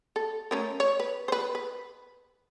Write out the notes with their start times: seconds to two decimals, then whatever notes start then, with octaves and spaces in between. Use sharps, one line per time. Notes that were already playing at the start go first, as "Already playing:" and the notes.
0.16 A4
0.51 A3 C#4 A#4
0.80 C#5
1.00 B4
1.28 B4 C5
1.55 B4